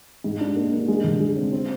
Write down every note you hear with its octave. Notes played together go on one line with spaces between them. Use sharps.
G#2
D4
A#3
D4
G#3
D3
G#3
C4
C4